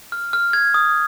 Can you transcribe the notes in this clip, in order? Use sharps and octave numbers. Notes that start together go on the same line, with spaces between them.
F6
F6
G#6
D#6